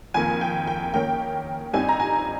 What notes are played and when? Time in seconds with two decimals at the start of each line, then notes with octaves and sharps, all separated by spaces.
0.14 F2 D#3 A#3 G#5
0.41 G5
0.67 G5
0.94 D#3 A#3 C#4 G5
1.73 G2 G3 C4 D#4 G#5
1.89 A#5
2.00 G#5